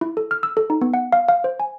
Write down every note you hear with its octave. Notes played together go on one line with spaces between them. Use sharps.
E4
A4
F6
E6
A4
D#4
B3
F#5
F5
F5
C5
G#5